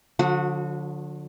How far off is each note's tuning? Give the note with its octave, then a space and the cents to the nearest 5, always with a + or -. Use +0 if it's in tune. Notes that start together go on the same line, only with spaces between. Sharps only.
D3 -5 F3 +45 F#4 -20